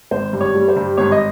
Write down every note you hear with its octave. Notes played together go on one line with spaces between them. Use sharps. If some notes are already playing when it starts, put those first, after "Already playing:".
G#1 C5
G2
C#5
G3
C5
G2
G#1 C#5
D#5